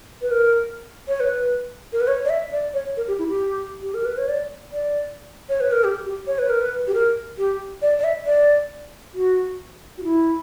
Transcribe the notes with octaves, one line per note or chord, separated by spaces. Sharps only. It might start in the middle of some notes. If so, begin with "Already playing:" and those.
B4
A#4
C#5
B4
A#4
B4
C#5
D5
E5
D5
C#5
A#4
G4
E4
G4
G4
A#4
B4
C#5
D5
D5
C#5
B4
A#4
G4
G4
C#5
B4
A#4
B4
G4
A#4
G4
D5
D5
E5
D5
F#4
F#4
E4